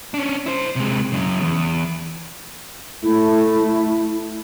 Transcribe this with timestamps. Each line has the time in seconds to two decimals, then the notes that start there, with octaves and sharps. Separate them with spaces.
0.14 C#4 D4
0.46 E4 C5
0.76 C3 G#3
1.12 F#2 C#3
1.41 E2
3.03 A3 E4